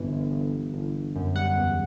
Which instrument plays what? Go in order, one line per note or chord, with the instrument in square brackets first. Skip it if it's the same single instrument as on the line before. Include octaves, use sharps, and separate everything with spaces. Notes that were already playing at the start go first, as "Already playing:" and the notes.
Already playing: [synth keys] G1 E3
G1
G1
G1
G1
G1
F#2
G3 F#5
E2